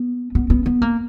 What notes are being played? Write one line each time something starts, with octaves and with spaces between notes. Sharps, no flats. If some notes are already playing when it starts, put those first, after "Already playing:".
Already playing: B3
B3
B3
B3
A#3